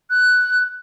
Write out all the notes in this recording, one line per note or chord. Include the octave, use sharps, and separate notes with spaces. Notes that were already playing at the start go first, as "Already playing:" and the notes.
F#6